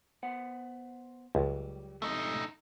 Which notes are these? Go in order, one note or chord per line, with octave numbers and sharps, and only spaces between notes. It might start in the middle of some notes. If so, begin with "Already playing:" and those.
B3 C5 F#5
C#2 F#3 G3
F2 G#2 C3 A3 D#4